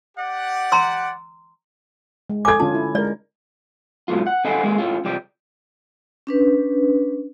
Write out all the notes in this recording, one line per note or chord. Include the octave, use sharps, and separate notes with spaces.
G4 D5 F#5
A#5 C6 E6
G#3
A4 G#5 D6 G#6
D3 C#4 F4 A5
E4
G#3 A#4 D5
G#2 B2 F#3 A3 F4
F#5
C#4 A4 D#5 F5 F#5 G#5
G#3 A#3 G#4
A2 C#4 F4
C2 F3 G4 D5
C#4 D4 B4